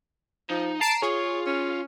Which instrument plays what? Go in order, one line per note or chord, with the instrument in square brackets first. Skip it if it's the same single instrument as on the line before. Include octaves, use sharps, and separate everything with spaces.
[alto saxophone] F3 [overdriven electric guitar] D#4
[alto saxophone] A5 [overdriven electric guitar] A#5 [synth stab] C7 D7 E7
[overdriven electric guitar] F4 [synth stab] G#4 [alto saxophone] C#5
[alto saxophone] C#4